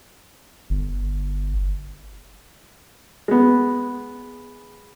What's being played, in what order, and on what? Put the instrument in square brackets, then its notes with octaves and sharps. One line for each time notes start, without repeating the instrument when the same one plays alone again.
[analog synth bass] G1
[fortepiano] G#3 B3